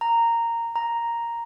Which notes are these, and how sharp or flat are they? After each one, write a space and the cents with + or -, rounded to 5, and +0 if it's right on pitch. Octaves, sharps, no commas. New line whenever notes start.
A#5 -10
A#5 +0